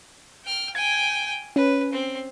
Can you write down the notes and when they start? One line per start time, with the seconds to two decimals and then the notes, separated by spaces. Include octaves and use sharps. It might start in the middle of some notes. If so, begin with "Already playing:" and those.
0.45 G5 F6
0.75 G5 G#5 G#6
1.56 C#4 B4
1.93 C4